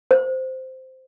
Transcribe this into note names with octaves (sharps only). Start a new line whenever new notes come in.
C5